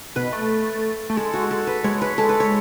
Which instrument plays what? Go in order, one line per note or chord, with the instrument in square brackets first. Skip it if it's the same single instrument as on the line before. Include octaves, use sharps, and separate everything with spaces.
[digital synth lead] B2 [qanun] B4
[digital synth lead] A3
A3
[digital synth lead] G#3 [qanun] A4
[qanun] F#4
A4
B4
[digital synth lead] G#3 [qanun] C#5
[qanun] B4
[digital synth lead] G#3 [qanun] A4
[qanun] B4
C#5